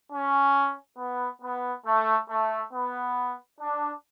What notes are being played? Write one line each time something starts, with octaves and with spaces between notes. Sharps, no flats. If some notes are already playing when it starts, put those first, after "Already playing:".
C#4
B3
B3
A3
A3
B3
D4